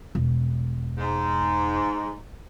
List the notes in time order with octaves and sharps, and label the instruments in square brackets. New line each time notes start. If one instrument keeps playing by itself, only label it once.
[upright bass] E1
[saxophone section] G#2